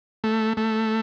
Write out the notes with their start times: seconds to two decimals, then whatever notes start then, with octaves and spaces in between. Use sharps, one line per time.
0.24 A3
0.57 A3